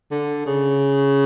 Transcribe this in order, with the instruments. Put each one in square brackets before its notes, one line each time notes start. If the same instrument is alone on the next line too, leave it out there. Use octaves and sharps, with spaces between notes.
[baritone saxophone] D3
C#3